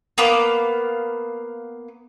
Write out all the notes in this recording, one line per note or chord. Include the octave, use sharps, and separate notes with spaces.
A#3 B3 F5 D6